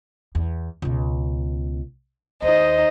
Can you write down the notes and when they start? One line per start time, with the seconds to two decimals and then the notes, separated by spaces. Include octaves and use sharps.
0.35 E2
0.82 C#2 B2
2.42 D#2 D#4 C5 D#5